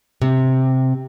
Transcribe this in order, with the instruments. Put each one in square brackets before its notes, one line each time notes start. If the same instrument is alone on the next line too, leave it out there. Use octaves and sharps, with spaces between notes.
[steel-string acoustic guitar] C3